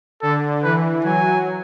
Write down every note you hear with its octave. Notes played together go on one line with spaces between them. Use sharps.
D3 A4
E3 B4
F#3 G#5